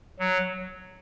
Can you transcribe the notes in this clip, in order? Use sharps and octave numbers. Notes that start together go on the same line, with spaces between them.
F#3